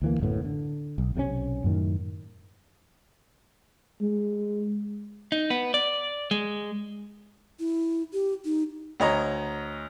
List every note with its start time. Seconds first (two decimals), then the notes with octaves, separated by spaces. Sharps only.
0.02 D2 E3 A#3
0.20 D1 F#2 A2 B3
0.45 D3
0.98 B1
1.15 B1 C3 A3 C#4
1.64 F#2 A2 D#3
4.01 G#3
5.32 D#4
5.50 B3
5.74 D5
6.31 G#3
7.60 E4
8.13 G4
8.45 D#4
9.00 D2 C#5 D#5 A#5